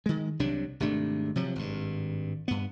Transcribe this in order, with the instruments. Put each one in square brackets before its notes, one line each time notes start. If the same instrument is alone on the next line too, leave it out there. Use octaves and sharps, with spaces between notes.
[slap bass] D#3 G#3
C2 C3 F#3 D4
G#1 C3 A3 D4
C3 F3 F#3
G#1 G2
G2 B3